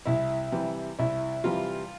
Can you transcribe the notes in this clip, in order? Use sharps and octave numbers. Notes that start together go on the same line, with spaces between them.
C2 E4
C3 E3 G3
C2 E4
C3 E3 G3 F4